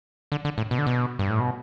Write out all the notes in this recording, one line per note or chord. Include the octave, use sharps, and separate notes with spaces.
D3
D3
A2
B2
D3
B2
G2
A2
B2